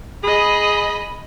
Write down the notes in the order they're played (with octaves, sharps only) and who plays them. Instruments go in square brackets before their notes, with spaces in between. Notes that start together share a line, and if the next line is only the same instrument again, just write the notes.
[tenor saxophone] G#4 [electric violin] D#5 B5